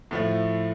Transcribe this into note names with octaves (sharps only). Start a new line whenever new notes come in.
A2 F3 A3